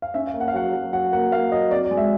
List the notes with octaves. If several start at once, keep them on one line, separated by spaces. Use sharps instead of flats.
F5
C#4 E5
F5
A#3
F#5
F5
F#3 F#5
F#3
F#3 F#5
A#3 F#5
A#3 F5
F#3 D#5
C4 D5
D5
G#3
E5